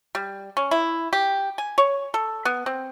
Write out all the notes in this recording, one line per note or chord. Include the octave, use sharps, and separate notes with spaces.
G3
C#4
E4
G4
G#5
C#5
A4
B3
C4